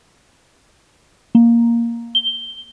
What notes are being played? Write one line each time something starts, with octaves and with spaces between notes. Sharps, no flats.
A#3
G7